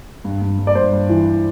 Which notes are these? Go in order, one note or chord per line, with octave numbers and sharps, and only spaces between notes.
G2
G2
G2
D5
G2 C5
G2
E3